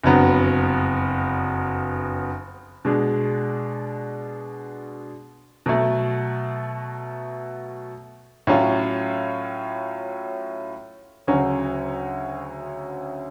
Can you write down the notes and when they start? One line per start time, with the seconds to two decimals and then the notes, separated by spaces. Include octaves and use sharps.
0.03 F#1 F2 D3 F#3 B3
2.85 B2 G#3 D4
5.66 B2 F#3 A3
8.47 A2 F#3 C#4 F4
11.27 D2 C#3 F#3 C#4 F#4